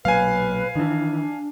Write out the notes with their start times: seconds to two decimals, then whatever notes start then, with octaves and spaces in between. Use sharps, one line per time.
0.05 B1 A#2 F#3 B4 F5 G#5
0.75 D#3 E3 D4